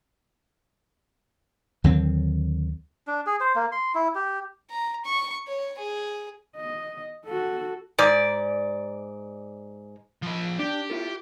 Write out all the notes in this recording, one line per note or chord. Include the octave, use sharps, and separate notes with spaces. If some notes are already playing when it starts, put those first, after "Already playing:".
D#2 D3 F#3 C4
D4
G#4
C5
A#3
C6
E4
G4
A#5
C#6
C#5
G#4
D#5
F#4 A4
G#2 D5
F3 B5
D4 G4
E4 F4 A4